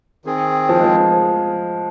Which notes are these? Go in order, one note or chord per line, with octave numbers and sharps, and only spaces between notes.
D#3 C4 G#4
F3
G#3
F3